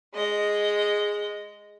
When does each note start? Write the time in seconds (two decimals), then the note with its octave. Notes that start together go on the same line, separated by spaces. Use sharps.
0.15 G#3 D#5